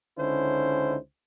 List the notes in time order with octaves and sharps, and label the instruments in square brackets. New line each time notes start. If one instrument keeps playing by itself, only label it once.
[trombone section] C#2 D3 C#4 D#4 E4 C5